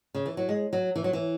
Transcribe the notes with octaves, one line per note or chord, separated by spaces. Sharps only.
C#3
E3
F#3
G#3
F#3
E3
F#3
E3